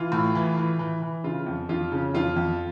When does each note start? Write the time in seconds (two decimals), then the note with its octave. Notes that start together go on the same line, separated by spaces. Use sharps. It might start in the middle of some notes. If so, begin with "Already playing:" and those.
Already playing: E3 F4
0.12 A2
0.35 E3
0.57 E3
0.79 E3
1.02 E3
1.24 C#3 F4
1.46 F2
1.69 F2 F4
1.92 C#3
2.14 F2 F4
2.36 F2